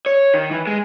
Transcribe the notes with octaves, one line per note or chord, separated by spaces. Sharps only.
C#5
D#3
E3
G#3